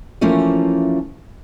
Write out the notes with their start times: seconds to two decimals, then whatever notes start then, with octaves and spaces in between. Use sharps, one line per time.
0.21 E3 F3 A3 A#3 C#4